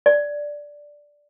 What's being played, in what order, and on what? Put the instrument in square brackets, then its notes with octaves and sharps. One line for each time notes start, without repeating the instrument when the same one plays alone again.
[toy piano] D5